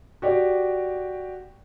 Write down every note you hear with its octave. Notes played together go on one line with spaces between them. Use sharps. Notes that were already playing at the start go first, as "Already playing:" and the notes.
F#4 G4 D5